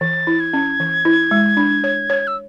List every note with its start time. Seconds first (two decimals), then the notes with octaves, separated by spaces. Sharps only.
0.01 E3 A6
0.27 E4
0.40 G#6
0.53 C#4
0.80 E3
1.05 E4
1.31 G#3
1.57 D4
1.84 C#5
2.10 C#5
2.27 E6